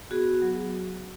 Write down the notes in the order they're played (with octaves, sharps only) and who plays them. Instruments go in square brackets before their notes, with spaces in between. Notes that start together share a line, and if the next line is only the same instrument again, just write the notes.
[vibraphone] B3 F#4 G#4
F#3